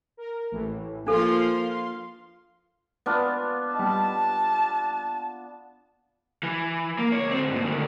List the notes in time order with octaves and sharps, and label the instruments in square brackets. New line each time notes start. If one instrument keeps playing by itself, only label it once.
[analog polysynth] A#4
A1 A2 E3
[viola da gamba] F3 A#3 F4 [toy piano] D4 A4 B4 [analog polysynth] F5 C6
[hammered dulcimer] B3 D4 F4
[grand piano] G3 D#5 [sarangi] A5
[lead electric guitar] E3
A#3
C#2 C#5
D2 C4
G2 A#2
D2 D#3